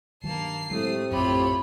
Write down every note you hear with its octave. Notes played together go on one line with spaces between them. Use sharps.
G2 D#3 F#3 A#3 A5 C7
A2 C3 F#3 G#3 A3 D#6
A#1 F#2 C4 F4 G4 C#5 B5